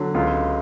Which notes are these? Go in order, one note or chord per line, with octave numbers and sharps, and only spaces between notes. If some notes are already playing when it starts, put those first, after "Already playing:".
Already playing: D3 F#3
C#2 F4